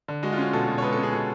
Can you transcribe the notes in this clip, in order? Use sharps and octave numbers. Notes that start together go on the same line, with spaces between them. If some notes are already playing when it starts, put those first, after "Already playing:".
D3
G#3 F#4
F4
C#4 F#4
B2 A4
B2
C#5
G#3 B4
A4
C#4
G#4
B2 A4